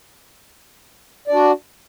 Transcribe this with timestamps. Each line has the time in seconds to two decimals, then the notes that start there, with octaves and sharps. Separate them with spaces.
1.28 D5
1.31 D4
1.34 F#4